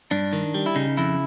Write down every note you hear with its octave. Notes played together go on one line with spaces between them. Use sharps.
G2 D4
D#3
G3
E4
C#3 D#4
F2 E4